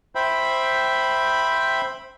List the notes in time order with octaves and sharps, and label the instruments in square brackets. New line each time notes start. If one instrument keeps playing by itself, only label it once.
[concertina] C5 E5 G5 B5